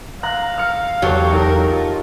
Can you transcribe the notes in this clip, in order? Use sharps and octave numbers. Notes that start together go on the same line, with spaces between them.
F5 A#5 F#6
F6 C#7
E2 F#3 G4 A4 C#5
D#4 A4 A#4
F4